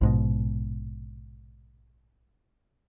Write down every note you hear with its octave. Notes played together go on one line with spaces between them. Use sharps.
A#1 G#2 B2